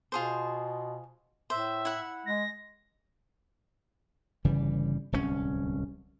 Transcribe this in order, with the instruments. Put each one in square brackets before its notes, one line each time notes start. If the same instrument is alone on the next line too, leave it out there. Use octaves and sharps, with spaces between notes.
[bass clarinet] B2 [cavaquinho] F4 G#4 C5
[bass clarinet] A2 [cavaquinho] C5 [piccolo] E5
[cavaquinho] E4 F#5
[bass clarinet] G#3 [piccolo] A#6
[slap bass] G1 C#3 E3 G3
D1 C2 C3 C#4